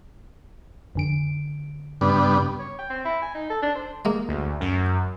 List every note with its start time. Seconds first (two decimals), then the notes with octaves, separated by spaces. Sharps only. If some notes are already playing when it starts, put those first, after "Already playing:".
0.95 F2 D3 D7
2.01 G2 C#3 B3 D4
2.59 C#5
2.78 G5
2.90 C4
3.05 E4
3.22 G#5
3.34 D#4
3.50 A4
3.62 D4
3.75 C5
4.05 G#3 A#3
4.29 D2
4.61 F#2